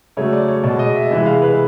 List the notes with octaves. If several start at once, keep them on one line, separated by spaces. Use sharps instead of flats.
C#3 F#3 A3 C#5
D5
C#5
B2 G#3 D5
D#5
E5
C3 E3 G#3 E5
F5
B4